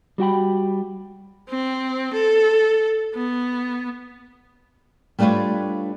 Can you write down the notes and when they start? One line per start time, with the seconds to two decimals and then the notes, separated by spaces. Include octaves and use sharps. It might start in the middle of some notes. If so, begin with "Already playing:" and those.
0.18 G3 F#4 G5 B5
1.49 C4
2.13 A4
3.15 B3
5.19 G3 A3 D4 F4 B4 C#5